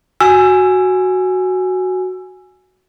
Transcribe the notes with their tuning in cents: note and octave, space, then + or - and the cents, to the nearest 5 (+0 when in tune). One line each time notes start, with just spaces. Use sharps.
F#4 +0 G#5 +0 E6 +20